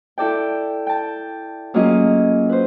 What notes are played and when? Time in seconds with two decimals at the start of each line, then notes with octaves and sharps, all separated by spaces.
0.18 E4 A4 D5 G5
0.87 G5 A5
1.74 F#3 A#3 C#4 F4 G#4 D#5
2.49 B4 C5